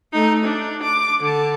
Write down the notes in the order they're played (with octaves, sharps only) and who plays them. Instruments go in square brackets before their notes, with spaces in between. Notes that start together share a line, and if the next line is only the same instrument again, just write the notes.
[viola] A3 D#4
D4
D6
D3 A5